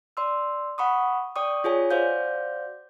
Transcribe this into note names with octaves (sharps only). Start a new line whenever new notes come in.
D5 C6 E6
F#5 B5 C#6 D#6
D5 G5 C#6 D#6
F4 G#4 C#5 G#5
F#4 C5 D5 F5 G6